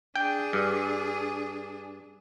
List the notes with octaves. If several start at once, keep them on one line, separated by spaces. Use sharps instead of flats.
D4 G#4 G5
G2